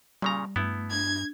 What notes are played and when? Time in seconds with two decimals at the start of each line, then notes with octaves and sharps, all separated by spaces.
0.22 A#2 C#3 G3 A#5
0.56 G2 A3 B3 E4
0.91 D4 G#6